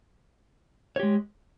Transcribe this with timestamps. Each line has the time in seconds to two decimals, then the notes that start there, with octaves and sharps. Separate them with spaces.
0.96 C#5
1.00 G4
1.03 G#3